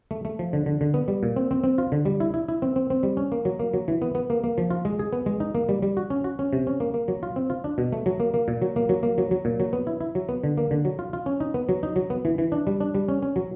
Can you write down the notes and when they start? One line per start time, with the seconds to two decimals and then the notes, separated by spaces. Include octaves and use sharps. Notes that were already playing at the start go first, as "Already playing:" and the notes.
0.11 A3
0.25 A3
0.39 F3
0.53 D3
0.66 D3
0.81 D3
0.94 B3
1.08 G3
1.23 A#2
1.36 C4
1.51 C4
1.64 C4
1.78 F4
1.92 D3
2.05 G3
2.20 E4
2.34 E4
2.48 E4
2.62 C4
2.76 C4
2.90 C4
3.03 G3
3.17 C#4
3.32 A#3
3.45 F#3
3.59 A#3
3.74 F#3
3.88 E3
4.02 B3
4.15 B3
4.30 A#3
4.44 A#3
4.58 F3
4.70 F4
4.85 G#3
4.99 G#4
5.13 B3
5.26 G#3
5.40 D#4
5.55 A#3
5.69 G3
5.82 G3
5.97 F#4
6.10 C#4
6.24 F#4
6.39 C#4
6.53 C3
6.67 C#4
6.80 A#3
6.94 A#3
7.08 F#3
7.23 F4
7.36 C4
7.50 F4
7.64 D4
7.78 B2
7.92 A3
8.06 F#3
8.20 A#3
8.34 A#3
8.48 A#2
8.62 F#3
8.76 A#3
8.89 F#3
9.03 A#3
9.18 F#3
9.31 F#3
9.45 A#2
9.60 F#3
9.73 B3
9.87 E4
10.01 E4
10.15 F#3
10.29 B3
10.44 D3
10.58 A#3
10.71 D3
10.85 F#3
10.99 F4
11.13 F4
11.26 C#4
11.40 D#4
11.54 B3
11.69 F#3
11.83 D#4
11.96 F#3
12.10 B3
12.25 E3
12.38 E3
12.52 D4
12.67 G3
12.80 D4
12.95 G3
13.08 C#4
13.23 C#4
13.36 F#3